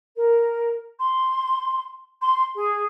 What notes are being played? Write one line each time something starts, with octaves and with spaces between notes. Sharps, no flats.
A#4
C6
C6
G#4